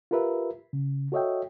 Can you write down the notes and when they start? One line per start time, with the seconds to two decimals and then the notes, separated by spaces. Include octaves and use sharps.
0.11 F4 G4 A#4 B4 E5
0.73 C#3
1.12 F#4 A4 C#5 D#5 E5 G5